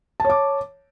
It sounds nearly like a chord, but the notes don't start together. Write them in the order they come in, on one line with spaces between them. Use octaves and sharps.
A5 C#5 D6